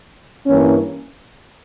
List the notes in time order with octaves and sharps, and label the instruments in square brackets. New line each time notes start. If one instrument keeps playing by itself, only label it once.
[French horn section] G2 E3 A#3 C#4